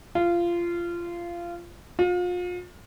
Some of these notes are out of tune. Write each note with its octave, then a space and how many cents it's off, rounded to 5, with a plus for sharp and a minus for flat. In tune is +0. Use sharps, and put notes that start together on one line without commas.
F4 -20
F4 +35